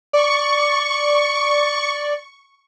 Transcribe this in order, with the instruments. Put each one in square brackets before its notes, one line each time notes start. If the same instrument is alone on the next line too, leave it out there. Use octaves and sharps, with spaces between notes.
[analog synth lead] D5 [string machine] C#6